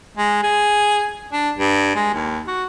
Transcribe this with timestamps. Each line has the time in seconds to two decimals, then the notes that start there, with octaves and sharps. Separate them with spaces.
0.17 G#3
0.44 G#4
1.33 D4
1.58 G2
1.95 G#3
2.14 D#2
2.48 F#4